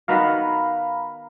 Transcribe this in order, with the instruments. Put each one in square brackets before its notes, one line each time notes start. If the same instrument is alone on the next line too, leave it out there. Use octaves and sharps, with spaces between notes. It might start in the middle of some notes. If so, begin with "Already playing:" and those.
[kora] D#3 B3 F#4 [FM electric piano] F5 A#5 B5